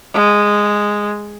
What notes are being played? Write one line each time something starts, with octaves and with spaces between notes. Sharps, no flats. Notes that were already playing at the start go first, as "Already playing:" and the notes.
G#3